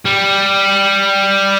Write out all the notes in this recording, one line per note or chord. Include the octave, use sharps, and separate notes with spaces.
G3